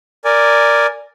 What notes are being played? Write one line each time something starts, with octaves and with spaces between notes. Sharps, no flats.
A#4 D5 G#5